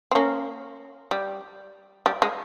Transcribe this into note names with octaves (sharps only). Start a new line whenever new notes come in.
C4
A#3 C#4
G3
G3
G#3